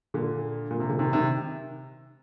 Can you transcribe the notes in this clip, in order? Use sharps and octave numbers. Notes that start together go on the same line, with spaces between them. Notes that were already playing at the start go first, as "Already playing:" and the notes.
A#2 D3
A#2
C3
A#2 D3
C3 D#3
C3 D#3